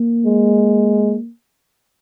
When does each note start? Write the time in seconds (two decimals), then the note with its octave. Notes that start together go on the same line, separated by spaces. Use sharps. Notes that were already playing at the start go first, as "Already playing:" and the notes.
Already playing: A#3
0.25 G#3